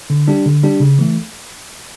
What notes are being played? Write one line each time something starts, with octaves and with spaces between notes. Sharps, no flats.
D3
G3 D4 G4
D3
G3 D4 G4
C#3
E3 A3